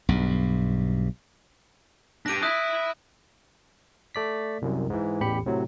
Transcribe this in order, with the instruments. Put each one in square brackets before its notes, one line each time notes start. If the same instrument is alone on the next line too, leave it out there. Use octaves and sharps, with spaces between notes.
[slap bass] B1 G2
[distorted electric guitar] D4 G4 [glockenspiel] A#6 D7 D#7
[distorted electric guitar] E4 E5 [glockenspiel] D#6 F#6
[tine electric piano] A3 D5 B6
C2 F#2
G#2 E3
A1 E2 G4 B5 C#7
A2 C3 F#3